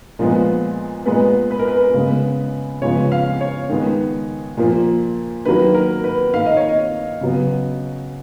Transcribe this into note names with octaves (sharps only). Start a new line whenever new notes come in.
A#2 F3 G#3 B3
A#2 G#3 B3 B4
B4
A#4
B4
C#3 G#3 B3
C#3 F3 G#3 B3 C#5
F5
C#5
D#3 G#3 B3
A#2 F3 A#3
D#3 F#3 A#3 B4
A#4
B4
D#3 A#3 F5
D#5
C#5
D#5
C#3 F#3 B3